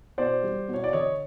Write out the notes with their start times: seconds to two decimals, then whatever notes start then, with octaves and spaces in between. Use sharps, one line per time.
0.18 B2 C5 D5
0.43 G3
0.68 B2
0.74 C#5
0.84 D5
0.93 D3 C#5 D#5